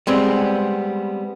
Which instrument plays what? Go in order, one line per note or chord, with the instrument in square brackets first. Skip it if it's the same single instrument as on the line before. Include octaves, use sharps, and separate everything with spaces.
[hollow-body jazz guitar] G3 G#3 B3 C4